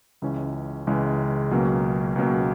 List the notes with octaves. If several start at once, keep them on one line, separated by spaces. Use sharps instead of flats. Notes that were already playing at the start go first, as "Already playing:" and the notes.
C#2 C#3 E3 G#3 C#4
C#2 C#3 E3 G#3 C#4
C#2 B2 F#3 A#3 C#4
C#2 B2 F#3 A#3 C#4